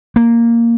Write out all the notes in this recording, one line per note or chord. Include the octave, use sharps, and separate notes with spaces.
A#3